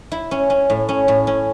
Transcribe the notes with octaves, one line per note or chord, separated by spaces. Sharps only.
E4
C#4
C#4
A2
C#4
A2
C#4